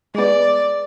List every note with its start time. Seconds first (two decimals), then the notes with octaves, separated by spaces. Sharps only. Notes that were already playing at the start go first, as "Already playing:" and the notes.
0.15 G#3 B3 D5